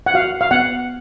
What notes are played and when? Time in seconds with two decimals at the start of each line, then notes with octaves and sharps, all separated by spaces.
0.06 F#5
0.14 F#4 F5
0.41 F5
0.51 B3 F#5